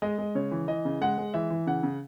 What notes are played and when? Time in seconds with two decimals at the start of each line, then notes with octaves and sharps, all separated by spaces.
0.02 G#3 D#5
0.18 G#3
0.35 C#3 C#5
0.51 E3
0.68 E3 D#5
0.85 C#3
1.01 G#3 F#5
1.18 G#3
1.34 E3 E5
1.51 E3
1.67 C#3 F#5
1.83 C#3